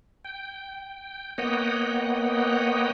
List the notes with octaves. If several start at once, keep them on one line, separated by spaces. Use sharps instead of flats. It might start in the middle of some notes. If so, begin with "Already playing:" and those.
G5
A#3 B3 C#5 D#5 F#5 G5